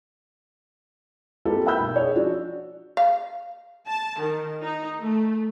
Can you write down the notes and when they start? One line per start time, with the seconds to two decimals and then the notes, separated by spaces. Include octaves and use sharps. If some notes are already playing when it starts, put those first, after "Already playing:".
1.45 A#3 C4 F4 G4 A4 B4
1.65 A#4 E5 F#5 B5 E6 G6
1.80 B1
1.96 G#4 C#5
2.15 F3 D4 F#4
2.97 F5
3.88 A5
4.20 D#3
4.61 D#4
5.00 A3